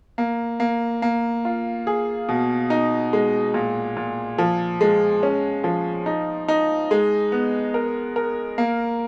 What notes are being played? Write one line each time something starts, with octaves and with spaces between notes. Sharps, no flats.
A#3
A#3
A#3
F4
G#4
B2
D#4
G#3
A#2
A#2
F3
G#3
C#4
F3
D#4
D#4
G#3
B3
A#4
A#4
A#3